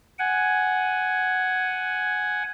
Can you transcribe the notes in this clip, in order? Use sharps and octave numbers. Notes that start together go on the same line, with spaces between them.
F#5 G#5